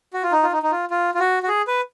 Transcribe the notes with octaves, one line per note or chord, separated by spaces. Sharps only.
F#4
F4
D#4
F4
D#4
D#4
F4
F4
F4
F#4
F#4
G#4
B4